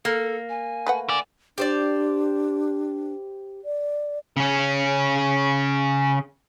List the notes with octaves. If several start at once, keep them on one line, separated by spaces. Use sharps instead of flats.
A#3 A4
G#5
A3 B4 F#5
D3 D5 G#5
D4 G4 C5 D5
D5
C#3 C#4